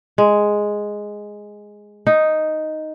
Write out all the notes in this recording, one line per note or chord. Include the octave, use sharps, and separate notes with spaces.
G#3
D#4